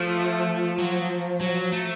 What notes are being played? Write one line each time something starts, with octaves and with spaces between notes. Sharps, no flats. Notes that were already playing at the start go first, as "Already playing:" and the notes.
Already playing: F3 A3
F#3
F#3
A3